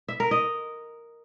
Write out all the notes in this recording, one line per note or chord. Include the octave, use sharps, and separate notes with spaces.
E5
A#4
D#5